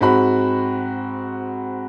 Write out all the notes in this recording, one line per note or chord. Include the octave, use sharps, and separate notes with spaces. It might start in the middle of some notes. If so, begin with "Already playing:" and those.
G#2 C4 F#4 B5